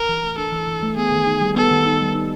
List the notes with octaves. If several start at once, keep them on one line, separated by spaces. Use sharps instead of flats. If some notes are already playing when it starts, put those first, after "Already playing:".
Already playing: A#4
E3
A3
D4 A4
E3
E3
A3
B3 G#4
D#3
D#4
G3
B3 A4
D#3
D#4
G3
D#4